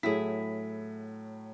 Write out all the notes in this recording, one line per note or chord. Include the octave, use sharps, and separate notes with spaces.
A2 F#3 E4 G#4 B6